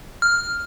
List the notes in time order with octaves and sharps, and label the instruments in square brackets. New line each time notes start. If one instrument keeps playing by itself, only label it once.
[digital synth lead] F6